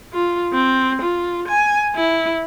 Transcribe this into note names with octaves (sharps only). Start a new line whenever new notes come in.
F4
C4
F4
G#5
E4